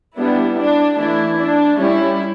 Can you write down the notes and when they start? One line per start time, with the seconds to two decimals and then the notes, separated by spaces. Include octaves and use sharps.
0.18 G3 B3 D4 E4
0.58 D4
0.98 E3 A3 D4 E4
1.38 D4
1.79 G3 C#4 E4